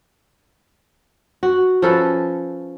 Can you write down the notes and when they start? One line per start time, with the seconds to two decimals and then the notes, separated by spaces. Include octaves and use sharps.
1.43 F#4
1.82 F3 C#4 A4 B4